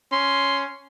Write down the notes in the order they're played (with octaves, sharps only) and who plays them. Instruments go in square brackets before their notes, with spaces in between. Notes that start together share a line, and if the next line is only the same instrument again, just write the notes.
[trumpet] C#4 [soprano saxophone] C6